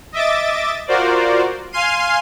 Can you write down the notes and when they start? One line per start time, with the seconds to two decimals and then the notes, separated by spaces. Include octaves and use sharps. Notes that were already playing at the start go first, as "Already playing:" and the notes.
0.12 D#5 E5 D6 A6
0.88 F4 F#4 A#4 C5 D5
1.72 F5 G#5 C6 F6 C7 D#7